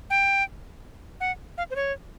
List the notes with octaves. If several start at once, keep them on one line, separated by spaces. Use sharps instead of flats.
G5
F#5
F5
C5
C#5